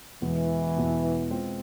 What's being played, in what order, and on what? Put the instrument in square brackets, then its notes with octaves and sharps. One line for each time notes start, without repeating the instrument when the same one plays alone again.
[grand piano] E2 B2 G#3 B3 E4 [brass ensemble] E3
[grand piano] E2 B2 G#3 B3 E4
G#3 C4 F4